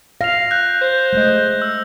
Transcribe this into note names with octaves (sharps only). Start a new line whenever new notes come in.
F5 A#6 F7
F#6 G6
C5
G#3 A3 D#5
E6